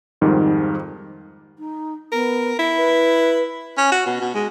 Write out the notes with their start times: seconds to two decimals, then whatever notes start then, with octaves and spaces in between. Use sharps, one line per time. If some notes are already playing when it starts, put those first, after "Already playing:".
0.21 F2 G#2 D#3 G3
1.58 D#4
2.12 B3 A#4
2.59 E4
2.76 B4
3.78 C#4
3.92 F#4
4.06 B2
4.21 B2
4.35 G#3